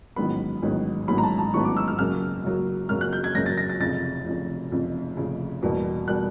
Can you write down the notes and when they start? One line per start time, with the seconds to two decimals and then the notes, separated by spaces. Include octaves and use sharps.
0.16 A1 G#2 D#3 F#3 B3 B5
0.62 A1 G#2 D#3 F#3 B3
1.08 A1 G#2 D#3 F#3 B3 B5
1.18 A#5
1.23 A5
1.38 A5
1.54 A1 G#2 D#3 F#3 B3 C#6
1.65 D6
1.77 E6
1.88 F6
1.99 F#2 C#3 F#3 A#3 F6
2.44 F#2 C#3 F#3 A#3
2.89 F#2 C#3 F#3 A#3 F6
3.01 F#6
3.13 G6
3.24 G#6
3.35 F#2 C#3 F#3 A#3 A#6
3.46 A6
3.58 A#6
3.69 A6
3.80 F1 F2 C#3 A6
4.26 F1 F2 C#3
4.72 F1 F2 C#3
5.17 F1 F2 C#3
5.63 E2 B2 G3 A#3
6.08 B2 G3 A#3 F#6